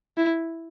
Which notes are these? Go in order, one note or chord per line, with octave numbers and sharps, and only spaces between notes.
E4